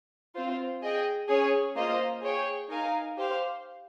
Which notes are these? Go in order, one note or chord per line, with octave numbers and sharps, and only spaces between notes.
C4 F4 C5
G#4 D#5 G5
C#4 G#4 C#5
A#3 F4 C5 D#5
G#4 C#5 G5
D#4 A#4 F5 G#5
G4 C5 F5